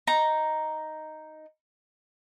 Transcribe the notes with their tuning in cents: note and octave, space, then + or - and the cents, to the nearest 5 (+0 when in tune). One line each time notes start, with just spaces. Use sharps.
D#4 +0 A#5 +0